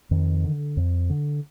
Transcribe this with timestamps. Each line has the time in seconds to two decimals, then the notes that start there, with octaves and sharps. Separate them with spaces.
0.11 F2 D#3
0.44 D3
0.77 F2
1.10 D3